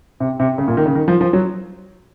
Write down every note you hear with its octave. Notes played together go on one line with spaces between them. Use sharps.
C3
C3
C#3
A#2
D#3
C#3
D#3
F3
F3
F#3